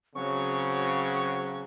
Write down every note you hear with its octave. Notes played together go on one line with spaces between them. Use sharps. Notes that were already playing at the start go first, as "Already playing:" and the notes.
C#3 F#3 C4 C#6